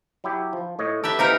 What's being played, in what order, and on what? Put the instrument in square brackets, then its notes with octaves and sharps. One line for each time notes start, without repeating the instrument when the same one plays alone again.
[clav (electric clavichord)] F#3 E4 G4
F3
A2 C#5 D#5
[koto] G4 B4 E5 [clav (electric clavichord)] A4 A#5
[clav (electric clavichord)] E3 A#3 [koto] C4 D#4 A#4